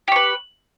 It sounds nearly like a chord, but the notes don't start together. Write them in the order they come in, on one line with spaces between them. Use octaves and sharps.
G4 C#6 B4